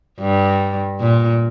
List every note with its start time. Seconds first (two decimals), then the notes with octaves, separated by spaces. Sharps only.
0.20 G2
1.00 A#2